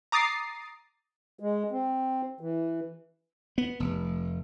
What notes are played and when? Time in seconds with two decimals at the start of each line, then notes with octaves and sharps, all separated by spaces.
0.12 A#5 D6 D#6 A6 C7
1.40 G#3
1.71 C4
2.41 E3
3.58 B3
3.80 F1